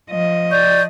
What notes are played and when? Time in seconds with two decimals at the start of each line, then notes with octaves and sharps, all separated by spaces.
0.11 F3 D#5
0.52 D5 C#6 G6